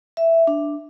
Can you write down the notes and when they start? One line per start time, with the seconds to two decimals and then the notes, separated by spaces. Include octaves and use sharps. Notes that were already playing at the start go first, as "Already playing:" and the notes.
0.17 E5
0.47 D4